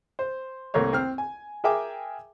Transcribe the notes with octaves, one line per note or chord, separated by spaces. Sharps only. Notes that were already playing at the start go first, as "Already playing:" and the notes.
C5
C2 A3 A#3 C#5
C4 F6
G#5
G#4 A#4 E5 G5 G#5 D6